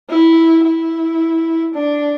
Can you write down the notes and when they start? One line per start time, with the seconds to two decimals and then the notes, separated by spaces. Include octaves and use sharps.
0.10 E4
0.64 E4
1.74 D4